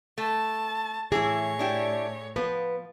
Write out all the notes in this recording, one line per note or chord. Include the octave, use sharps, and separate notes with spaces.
A3 A5
A2 E3 E4 G#4 C#5
D4 E4 G4
F3 B3 B4